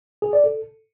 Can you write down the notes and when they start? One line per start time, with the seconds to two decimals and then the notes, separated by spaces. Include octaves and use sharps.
0.22 G#4
0.33 D5
0.44 A4